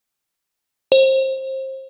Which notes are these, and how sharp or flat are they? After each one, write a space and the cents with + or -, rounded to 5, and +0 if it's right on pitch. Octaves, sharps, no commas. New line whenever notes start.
C5 +25